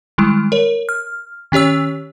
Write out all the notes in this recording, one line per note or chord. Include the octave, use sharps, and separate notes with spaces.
D#3 G3 G#3 E4
A#4 C#5
F6
D#3 C#4 G4 C#5 E6